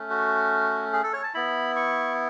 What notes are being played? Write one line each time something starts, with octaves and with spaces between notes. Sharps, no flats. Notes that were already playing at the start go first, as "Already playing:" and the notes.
Already playing: A3 C#4
F#4
G#4
A4
C#5
A5
B3 E4 B5
C#6